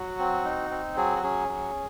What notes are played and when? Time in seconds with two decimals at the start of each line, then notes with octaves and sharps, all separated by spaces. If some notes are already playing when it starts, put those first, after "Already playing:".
Already playing: F#3 F#4
0.19 C4
0.45 D#4
0.70 C4
0.97 F#3 G#4
1.16 F#4
1.23 C#4 G#4
1.48 F#3